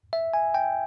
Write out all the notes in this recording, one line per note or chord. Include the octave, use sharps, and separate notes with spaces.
E5
G#5
G5